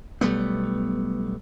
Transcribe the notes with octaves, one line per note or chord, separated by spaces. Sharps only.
B1 G3 A3 B3